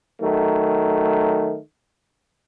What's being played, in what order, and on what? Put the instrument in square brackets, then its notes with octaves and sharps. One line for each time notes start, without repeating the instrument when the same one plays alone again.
[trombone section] D#3 F#3 A3